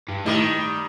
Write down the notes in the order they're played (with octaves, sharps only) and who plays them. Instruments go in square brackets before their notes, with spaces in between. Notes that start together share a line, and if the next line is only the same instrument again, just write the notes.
[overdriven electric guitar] G2
[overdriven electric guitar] A2 [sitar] D#3 G3